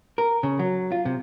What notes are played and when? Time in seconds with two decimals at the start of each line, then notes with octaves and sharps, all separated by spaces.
0.18 A#4
0.43 C#3
0.59 F#3
0.92 F4
1.05 C3